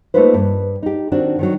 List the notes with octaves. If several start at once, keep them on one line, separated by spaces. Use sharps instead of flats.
A3 A#3 D#4 F4 B4 C5
G2
D#4 G4
D#3 C4 D4 F#4
D#3 F3 F#3